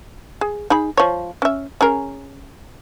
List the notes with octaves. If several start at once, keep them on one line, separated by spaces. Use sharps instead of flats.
G#4
D#4 G#4 B5
F3 C#5
C#4 E5
C#4 G#4 A#4